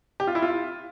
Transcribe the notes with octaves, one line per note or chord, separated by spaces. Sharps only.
G4
F4
E4
F4